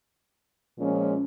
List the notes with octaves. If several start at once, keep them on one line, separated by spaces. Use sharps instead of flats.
A#2 F3 G#3 C#4